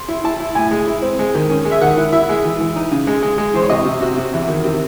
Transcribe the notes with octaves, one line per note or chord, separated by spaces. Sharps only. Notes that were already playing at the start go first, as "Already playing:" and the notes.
Already playing: C6
E4
E4 A5
E4
A2 G#5
G#3
E4
C4
G#3
D#3
C#4
G#3
E5
D#3 F#5
E4
E4 E5
G#3
E3
E3
D#4
C#3
G#3
G#3
G#3
E3 C5
C#5
C3 D#5
C3
C3 F#4
C3
E2
D#3
C3